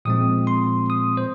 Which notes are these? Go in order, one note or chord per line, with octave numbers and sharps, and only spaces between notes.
A#2 F3 G#3 C4 D#6
C6
D#6
C5